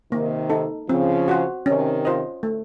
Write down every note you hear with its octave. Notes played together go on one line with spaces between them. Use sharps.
C3 D#3 A#3
D#4 A4
C#3 F3 C4
F#4 C5 F#5
C3 D#3 C#4
F4 C5 D#5
A3